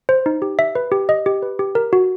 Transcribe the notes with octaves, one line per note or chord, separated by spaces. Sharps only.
C5
D#4
G4
E5
B4
G4
D#5
G4
B4
G4
A#4
F#4